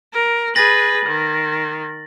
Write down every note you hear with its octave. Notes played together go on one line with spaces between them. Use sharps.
A#4
G#4 B4 A6 A#6 F#7
D#3